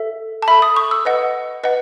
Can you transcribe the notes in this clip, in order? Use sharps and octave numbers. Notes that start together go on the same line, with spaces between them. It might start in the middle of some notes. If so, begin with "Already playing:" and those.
Already playing: A4 E5
A5
A4 E5 B5
D#6
C#6
E6
B4 D#5 F#5
B4 D#5 F#5